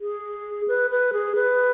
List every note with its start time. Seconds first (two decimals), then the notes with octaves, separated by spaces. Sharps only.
0.01 G#4
0.68 B4
0.91 B4
1.13 G#4
1.35 B4